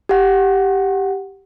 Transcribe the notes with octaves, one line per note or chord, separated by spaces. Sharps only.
G4 F#5